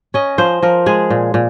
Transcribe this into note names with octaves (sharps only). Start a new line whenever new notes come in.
C#4 D#5
F3 C5
F3 A#4
G#3 G#4
A#2
A#2